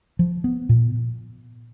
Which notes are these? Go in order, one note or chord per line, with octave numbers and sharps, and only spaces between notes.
F3
B3
A#2